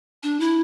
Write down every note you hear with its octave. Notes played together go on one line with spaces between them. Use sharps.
D4
E4